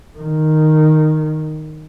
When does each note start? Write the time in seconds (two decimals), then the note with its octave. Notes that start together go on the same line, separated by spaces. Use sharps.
0.18 D#3